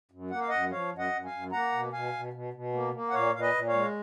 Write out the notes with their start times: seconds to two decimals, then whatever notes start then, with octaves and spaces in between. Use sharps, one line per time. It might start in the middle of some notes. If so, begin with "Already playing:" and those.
0.11 F#2
0.31 A#3 F#5
0.40 F5
0.49 F#2 D#5 F#5
0.71 F3 C#5 F5
0.92 F#2
0.98 D#5 F#5
1.12 F#2
1.25 F5 G#5
1.31 F#2
1.52 A#3 F#5 A#5
1.72 B2
1.92 B2 F5 G#5
2.13 B2
2.33 B2
2.54 B2
2.73 A#3
2.93 A#3
3.10 F#5
3.13 A#2 C#5 F5
3.33 A#2 F5
3.40 B4 D#5
3.54 A#2
3.67 C#5 F5
3.73 G#3